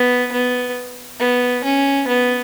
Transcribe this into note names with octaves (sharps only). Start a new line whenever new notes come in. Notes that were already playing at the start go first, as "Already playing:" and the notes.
Already playing: B3
B3
B3
C#4
B3